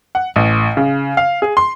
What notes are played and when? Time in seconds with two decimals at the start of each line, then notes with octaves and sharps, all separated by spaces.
0.15 F#5
0.36 A1
0.77 C#3
1.17 F5
1.42 G#4
1.57 C6